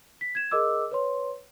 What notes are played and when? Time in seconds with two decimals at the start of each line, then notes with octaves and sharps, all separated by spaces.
0.21 B6
0.35 G#6 E7
0.51 G#4 A#4 D#5 D6 E6
0.91 B4 C#5 C6